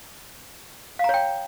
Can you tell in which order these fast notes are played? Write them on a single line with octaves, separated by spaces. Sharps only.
F5 A#5 C#5 G5